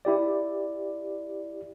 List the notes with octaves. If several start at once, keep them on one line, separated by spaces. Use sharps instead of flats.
E4 G4 D5